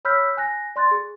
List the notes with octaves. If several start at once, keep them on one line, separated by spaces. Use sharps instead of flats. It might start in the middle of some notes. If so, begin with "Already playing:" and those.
C#5 B5 E6 F6 G6 B6
G#5 F#6 A#6
D5 C6 F#6 A6
G#4